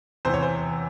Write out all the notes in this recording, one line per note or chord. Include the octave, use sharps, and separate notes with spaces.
E2 C3 E3 C5
C#5
C5